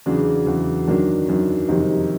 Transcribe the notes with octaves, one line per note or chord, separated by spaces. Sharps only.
E2 C#3 F#3 D4
E2 C#3 F#3
F#2 D#3 F#3 D4
F#2 D#3 F#3
F2 C3 D#3 G3 D#4